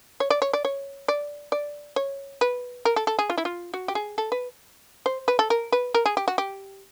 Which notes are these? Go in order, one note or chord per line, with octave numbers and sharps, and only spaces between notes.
C#5
D5
C#5
D5
C#5
D5
D5
C#5
B4
A#4
A4
A4
G#4
F4
E4
F4
F#4
G4
G#4
A4
B4
C5
B4
A4
A#4
B4
A#4
G#4
G4
F#4
G4